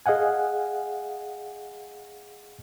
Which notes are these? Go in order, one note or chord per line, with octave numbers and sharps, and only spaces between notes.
G#4 D#5 F5 F#5 G#5